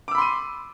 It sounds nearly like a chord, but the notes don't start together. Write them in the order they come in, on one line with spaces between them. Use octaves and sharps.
D6 E6 B5 C6 D#7